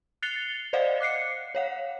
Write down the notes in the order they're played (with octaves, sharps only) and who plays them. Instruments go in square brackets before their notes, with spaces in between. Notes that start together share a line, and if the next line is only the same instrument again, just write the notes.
[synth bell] F#6 A6 C7 C#7 F7 G7
C5 D5 D#5 F5 F#5
D6 F#6 C7 C#7
C#5 F5 F#5